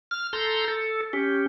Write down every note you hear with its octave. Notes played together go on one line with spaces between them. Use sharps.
F6
A4 A#5 C6 G6
A4
C#4 G4